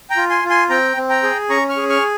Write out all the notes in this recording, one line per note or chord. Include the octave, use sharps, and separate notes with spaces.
G5 A#5
F4
G#5 C6
F4
G#5 C6
C4 G5 A#5
C4
G5 A#5
G#4
C#4 A#5 C#6
C#6 F6
G#4
C#6 F6